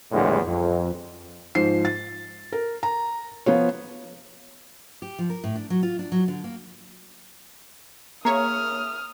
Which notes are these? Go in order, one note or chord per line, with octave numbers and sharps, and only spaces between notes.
A#1 E2 A2 D3 G3 G#3
F2
G#2 F3 C5 C7
A6
A#4
A#5
F3 B3 F4 C#5
G4
F3
A#4
A2
D4
F#3
F4
D4
F#3
D3
A#3
A#3 G#4 C#5 E5 A#5 D#6 F6